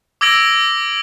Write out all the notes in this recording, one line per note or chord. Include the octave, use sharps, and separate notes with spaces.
D6 E6 G#6 A#6 D7 F#7